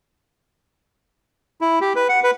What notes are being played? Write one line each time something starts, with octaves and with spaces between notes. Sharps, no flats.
E4
G4
B4
F#5
B4